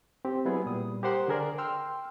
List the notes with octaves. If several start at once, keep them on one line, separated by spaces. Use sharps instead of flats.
C4 G4
F#3 G3 B3 E4 G#4
A#2 G3 D#6
G4 A#4 C5 F#5 C6
D3 G#4 A#4 D5
G5 C6 E6 F6